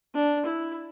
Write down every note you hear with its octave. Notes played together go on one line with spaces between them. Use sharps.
D4
E4